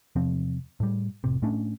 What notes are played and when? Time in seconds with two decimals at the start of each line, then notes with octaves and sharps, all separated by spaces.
0.16 E2 C3 F3 C4
0.80 A2 G3
1.24 F1 A2 C3
1.42 A2 A3 C#4 D4